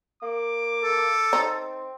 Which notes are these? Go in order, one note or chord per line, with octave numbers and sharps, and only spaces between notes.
A#3 D6
A4
C4 D#4